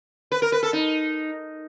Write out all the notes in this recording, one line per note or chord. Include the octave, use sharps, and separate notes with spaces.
B4
A#4
B4
A4
D#4